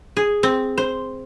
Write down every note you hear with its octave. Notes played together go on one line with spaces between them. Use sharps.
G#4
C4
C5